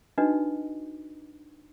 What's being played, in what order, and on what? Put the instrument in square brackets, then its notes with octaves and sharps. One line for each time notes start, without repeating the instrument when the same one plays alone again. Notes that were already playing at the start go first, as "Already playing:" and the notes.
[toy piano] D4 D#4 F#4 B4 D#5